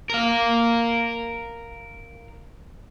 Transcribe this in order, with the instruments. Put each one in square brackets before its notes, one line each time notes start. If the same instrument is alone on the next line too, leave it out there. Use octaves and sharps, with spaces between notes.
[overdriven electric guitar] A#4 F5